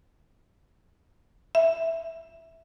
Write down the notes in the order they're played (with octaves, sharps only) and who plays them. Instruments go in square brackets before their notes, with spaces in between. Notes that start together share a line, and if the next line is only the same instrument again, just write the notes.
[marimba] E5